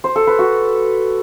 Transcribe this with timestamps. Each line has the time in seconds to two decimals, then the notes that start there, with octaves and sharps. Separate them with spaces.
0.04 C5
0.16 A4
0.27 B4
0.39 F#4